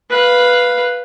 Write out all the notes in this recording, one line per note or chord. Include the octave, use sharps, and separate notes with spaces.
B4 F5